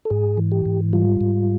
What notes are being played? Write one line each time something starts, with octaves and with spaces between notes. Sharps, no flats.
A4
G#2 G#4
E3
G4
G#2
G3 F4
G#2